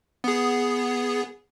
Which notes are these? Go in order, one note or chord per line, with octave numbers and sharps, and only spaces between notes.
B3 G#4